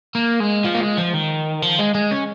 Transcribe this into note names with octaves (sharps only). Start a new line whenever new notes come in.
A#3
G#3
F3
A#3
G#3
F3
D#3
F3
G#3
G#3
C#4